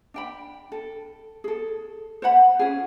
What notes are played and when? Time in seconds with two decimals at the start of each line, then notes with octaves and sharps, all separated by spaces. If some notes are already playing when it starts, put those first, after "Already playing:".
0.14 D4 G5 B5
0.72 A4
1.44 G#4 A4
2.22 C5 C#5 F#5 B5
2.59 C#4 F4 G#4